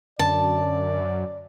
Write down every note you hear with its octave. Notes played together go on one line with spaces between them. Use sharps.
F#2 D3 D5 A5